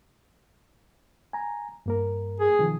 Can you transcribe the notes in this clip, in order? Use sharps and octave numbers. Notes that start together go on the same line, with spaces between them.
G#5 A#5
G2 A#3 A#4
G#4
B2 D#3 F3